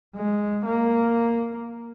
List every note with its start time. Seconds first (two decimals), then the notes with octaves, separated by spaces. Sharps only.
0.16 G#3
0.65 A#3